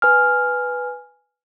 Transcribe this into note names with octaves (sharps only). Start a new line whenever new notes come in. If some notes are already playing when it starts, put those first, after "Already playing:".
B4 G#5 F6